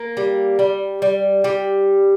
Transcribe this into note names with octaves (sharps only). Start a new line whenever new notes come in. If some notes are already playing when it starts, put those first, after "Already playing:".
Already playing: A#3
G3
G3
G3
G3